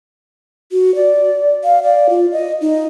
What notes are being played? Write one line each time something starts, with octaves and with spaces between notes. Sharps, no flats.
F#4
D5
F5
D5
F4
D#5
D#4